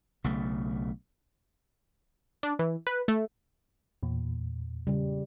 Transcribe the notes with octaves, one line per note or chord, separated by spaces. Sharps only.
B1 C#3 A3
D4
E3
B4
A3
E2 A#2
C#3 G3